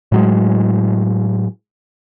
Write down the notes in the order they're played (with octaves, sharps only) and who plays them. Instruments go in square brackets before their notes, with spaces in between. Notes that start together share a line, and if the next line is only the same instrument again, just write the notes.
[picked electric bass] A2 F#3 G#3